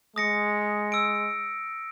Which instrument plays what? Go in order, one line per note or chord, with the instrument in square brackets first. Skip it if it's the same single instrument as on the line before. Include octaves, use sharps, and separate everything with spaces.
[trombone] G#3 [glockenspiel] D#6 A#6 C#7
[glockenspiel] E6 D7